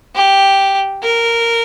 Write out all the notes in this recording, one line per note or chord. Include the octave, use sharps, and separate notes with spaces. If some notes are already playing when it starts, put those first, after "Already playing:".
G4
A#4